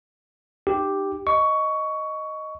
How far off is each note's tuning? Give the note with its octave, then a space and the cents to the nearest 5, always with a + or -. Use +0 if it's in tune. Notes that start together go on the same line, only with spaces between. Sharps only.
D#4 -30 G4 +0
D#5 +0 C#6 +15